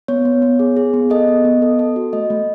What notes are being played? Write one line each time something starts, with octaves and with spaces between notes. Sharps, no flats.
B3 C#5
B3
B3
G#4
G#4
B3
A4 D#5
B3
B3
A4
A4
F#4
A3 D#5
A3